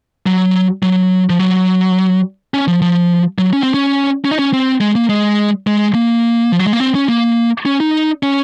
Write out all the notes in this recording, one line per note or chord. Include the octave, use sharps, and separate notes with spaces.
F#3
F#3
F3
F#3
C#4
F3
F3
F#3
C#4
C4
C#4
C#4
D#4
C#4
C4
G#3
A#3
G#3
G#3
A#3
F3
F#3
G#3
A#3
C4
C#4
A#3
C#4
D#4
C#4